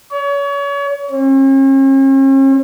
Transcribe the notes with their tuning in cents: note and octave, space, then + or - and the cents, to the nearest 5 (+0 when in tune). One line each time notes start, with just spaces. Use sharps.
C#5 +35
C#4 -45